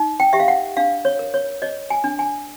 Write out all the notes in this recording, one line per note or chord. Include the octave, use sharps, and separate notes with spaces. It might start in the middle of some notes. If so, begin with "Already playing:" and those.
Already playing: D#4
G5
G4 E5
F5
F#5
D4 F5
C#5
A#4
C#5
C#5 D#5
G#5
D4
G#5